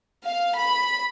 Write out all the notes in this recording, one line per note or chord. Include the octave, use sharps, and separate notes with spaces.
F5
B5